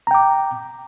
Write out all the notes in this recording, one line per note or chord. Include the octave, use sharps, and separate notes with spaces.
G5 A#5 D6